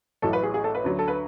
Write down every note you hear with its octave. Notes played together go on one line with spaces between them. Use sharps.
A1 A2 F#3 A4
B4
G#4
G#4
A4
B4
D2 D3 F#3
A4
B4